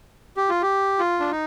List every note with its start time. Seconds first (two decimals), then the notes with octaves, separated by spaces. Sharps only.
0.37 G4
0.49 F4
0.62 G4
0.99 F4
1.20 D4
1.31 D#4